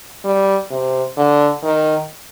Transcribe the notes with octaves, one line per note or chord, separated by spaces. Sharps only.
G3
C3
D3
D#3